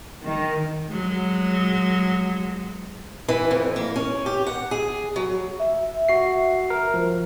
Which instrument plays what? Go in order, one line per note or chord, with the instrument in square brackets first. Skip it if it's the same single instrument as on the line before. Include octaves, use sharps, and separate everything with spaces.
[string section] D#3
[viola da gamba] F#3 G#3
[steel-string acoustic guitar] E3
F2
A#3
C#4
G4
F#5
G#4
F#3
[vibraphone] E5
[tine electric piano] F#4 C7
A#4
F3